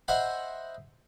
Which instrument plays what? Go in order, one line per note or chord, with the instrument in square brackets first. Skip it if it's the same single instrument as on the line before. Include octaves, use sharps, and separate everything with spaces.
[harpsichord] C5 D#5 E5 F#5 G#5 B5